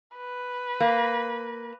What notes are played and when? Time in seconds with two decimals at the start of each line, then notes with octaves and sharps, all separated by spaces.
0.17 B4
0.80 A#3